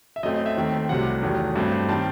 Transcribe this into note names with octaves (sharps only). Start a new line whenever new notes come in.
E5
F#2 F#3 A3 C4 D#5
D#5
E5
D#2 D#3 A3 C4
C2 C3 F#3 A3 F#5
E2 D#3 F#3 A3
G2 F#3 A3 C4
D#3 G3 C4 A5